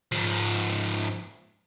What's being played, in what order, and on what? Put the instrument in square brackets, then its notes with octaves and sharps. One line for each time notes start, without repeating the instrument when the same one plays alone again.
[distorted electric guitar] G#2 F3